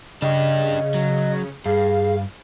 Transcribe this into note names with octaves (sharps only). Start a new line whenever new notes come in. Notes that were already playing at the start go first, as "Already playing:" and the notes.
C#3 D4 G4 D#5
F#3
G2 G#4 F5